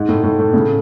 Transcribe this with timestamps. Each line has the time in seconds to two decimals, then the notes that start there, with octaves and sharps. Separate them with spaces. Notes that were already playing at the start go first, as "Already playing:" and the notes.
Already playing: G#2
0.09 A2
0.23 A2
0.39 A2
0.53 A2 C#3